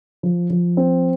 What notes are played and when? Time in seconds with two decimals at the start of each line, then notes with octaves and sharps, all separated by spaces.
0.23 F3
0.50 F3
0.77 C4